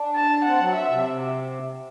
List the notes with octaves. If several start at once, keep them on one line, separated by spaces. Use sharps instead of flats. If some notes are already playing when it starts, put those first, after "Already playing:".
Already playing: D4
A5
C4 F#5
F#3
E5
C3